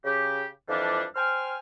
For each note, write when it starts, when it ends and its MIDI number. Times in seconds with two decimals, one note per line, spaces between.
0.04 0.45 49
0.04 0.45 67
0.68 1.02 41
0.68 1.02 52
0.68 1.02 53
0.68 1.02 55
0.68 1.02 62
1.15 1.56 72
1.15 1.56 79
1.15 1.56 80
1.15 1.56 89